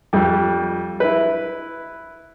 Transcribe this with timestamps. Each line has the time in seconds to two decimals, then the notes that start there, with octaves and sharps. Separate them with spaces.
0.13 F2 G3
1.00 E4 B4